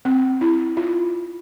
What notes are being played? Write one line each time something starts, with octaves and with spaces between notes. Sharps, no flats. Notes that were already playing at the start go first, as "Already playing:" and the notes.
C4
E4
F4